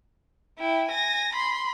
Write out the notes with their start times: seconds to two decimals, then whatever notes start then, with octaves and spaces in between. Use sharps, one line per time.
0.59 E4 G5
0.88 G#5 A#6
1.33 B5 C6